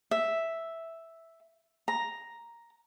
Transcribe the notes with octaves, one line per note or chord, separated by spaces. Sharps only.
E5
A#5